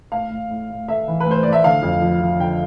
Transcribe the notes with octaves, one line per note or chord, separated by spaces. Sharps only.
A2 F5
A2
A2
A2
A3 E5
E3
B4
A2 C5
A2 D5
E5
D3 F5
F2
F3
F3
D3 G5